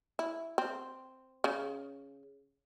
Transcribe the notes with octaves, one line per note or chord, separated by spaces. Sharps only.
E4
C4
C#3